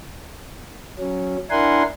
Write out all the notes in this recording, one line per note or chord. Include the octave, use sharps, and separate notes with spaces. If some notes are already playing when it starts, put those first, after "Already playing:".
F#3 C#4
D4 E4 A#4 F#5 G#5 C6